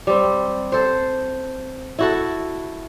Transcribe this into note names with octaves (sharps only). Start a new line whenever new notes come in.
G3 C4
A4 C5
E4 F#4 A4